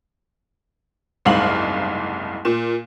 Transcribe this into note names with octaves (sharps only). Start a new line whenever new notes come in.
F#1 C2 G#2 F5 F#7
A#2 E7